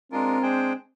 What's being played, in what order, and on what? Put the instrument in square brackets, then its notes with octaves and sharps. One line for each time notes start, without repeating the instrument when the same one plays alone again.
[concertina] G#3 D4 F4 A#4 [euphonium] C4
[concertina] G#3 D4 G#4 C5 G5